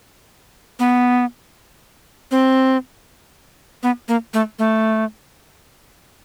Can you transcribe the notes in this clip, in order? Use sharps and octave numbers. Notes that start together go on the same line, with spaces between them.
B3
C4
B3
A#3
A3
A3